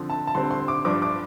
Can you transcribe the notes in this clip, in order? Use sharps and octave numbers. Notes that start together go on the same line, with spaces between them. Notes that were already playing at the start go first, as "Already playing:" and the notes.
Already playing: D3 F3 C4
A5
A5
D3 G3 C4 C6
C6
D6
G2 F3 D4 D6
D6